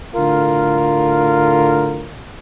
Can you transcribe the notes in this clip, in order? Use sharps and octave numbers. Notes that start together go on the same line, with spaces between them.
A2 D3 F4 A#4